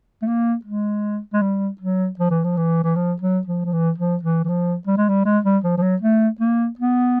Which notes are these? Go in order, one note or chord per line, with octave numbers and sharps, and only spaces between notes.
A3
A#3
G#3
G#3
G3
F#3
F3
E3
F3
E3
E3
F3
F#3
F3
F3
E3
F3
E3
E3
F3
G3
G#3
G3
G#3
G3
F3
F3
F#3
A3
A#3
B3